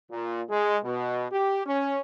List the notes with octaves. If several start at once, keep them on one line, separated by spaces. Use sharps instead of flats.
A#2
G#3
B2
G4
C#4